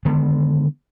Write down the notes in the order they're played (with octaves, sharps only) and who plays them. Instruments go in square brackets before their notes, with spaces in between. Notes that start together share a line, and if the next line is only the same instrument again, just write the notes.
[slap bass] D3 D#3 G#3 B3